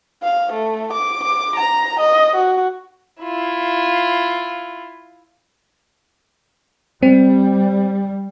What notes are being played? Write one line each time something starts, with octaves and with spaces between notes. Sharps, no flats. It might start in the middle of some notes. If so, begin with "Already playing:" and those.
F5
A3
D6
D6
A#5
D#5
F#4
E4 F4
G3 C4